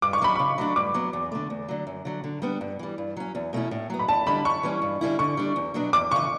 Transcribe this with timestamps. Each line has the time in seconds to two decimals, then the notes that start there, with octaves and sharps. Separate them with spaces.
0.02 G2 D6
0.13 C#6
0.21 F#3 C#4 B5
0.35 C#3 C#6
0.58 F#3 A3 D4
0.76 G2 D6
0.94 F#3 B3
1.13 E2
1.32 D3 A3
1.50 E2
1.69 D3 F#3
1.87 F#2
2.05 D3 F#3
2.24 D3
2.42 G3 B3 D4
2.61 G2
2.79 E3 G3
2.98 G2
3.17 F#3 C#4
3.35 E2
3.53 B2 A3 C#4 E4
3.71 A2
3.90 F#3 B3
3.99 B5
4.08 E2 A5
4.26 D3 G3 D4 B5
4.45 F#2 C#6
4.63 E3 G3 C#4
4.82 G2
5.01 D3 G3 C#4 E4
5.19 D3 C#6
5.37 G3 D4
5.56 E2
5.74 B2 F#3 B3 D4
5.93 E2 D6
6.11 C#3 C#6
6.16 E3